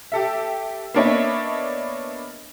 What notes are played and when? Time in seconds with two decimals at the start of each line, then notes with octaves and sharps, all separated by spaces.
0.12 G4 A4 E5
0.94 A#3 B3 D4 C#5 D#5 E5